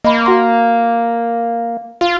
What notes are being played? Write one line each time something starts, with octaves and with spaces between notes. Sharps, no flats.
A#3 D#5 B5
F#4 F#5 C6
F4 F5